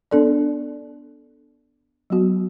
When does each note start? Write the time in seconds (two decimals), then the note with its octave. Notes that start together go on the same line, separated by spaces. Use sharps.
0.11 B3 D4 A4 D5
2.10 F#3 B3 F#4